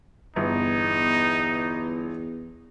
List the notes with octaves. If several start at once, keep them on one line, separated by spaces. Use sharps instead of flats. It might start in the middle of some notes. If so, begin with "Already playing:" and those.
G1 E2 D#4